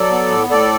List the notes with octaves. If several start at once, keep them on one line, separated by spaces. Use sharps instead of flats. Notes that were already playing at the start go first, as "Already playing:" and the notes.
Already playing: F#3 A4 D5
B3
A2
A2 A4 D5